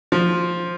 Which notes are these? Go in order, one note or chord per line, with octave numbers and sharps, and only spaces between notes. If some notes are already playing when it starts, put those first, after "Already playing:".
F3